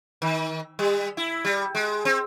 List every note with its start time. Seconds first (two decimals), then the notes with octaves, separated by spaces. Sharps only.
0.22 D#3
0.79 G3
1.17 E4
1.45 G3
1.75 G#3
2.05 C4